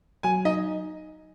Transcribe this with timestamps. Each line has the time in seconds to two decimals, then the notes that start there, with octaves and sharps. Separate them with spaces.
0.23 F#3 G#5
0.45 D#4 D#5